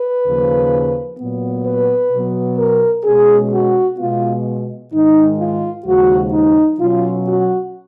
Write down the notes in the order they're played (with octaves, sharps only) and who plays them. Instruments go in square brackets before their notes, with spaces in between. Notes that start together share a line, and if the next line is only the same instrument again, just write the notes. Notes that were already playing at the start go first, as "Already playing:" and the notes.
Already playing: [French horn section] B4
D#2 C#3 F3 A#3
A#2 F#3 B3
B4
B2 F#3 B3
A#4
B2 G#3 C#4 G#4
F#4
B2 G#3 B3 F4
G#2 D#3 G#3 D#4
F4
D#2 C#3 F3 G#3 F#4
D#4
B2 F#3 C#4 F4
F#4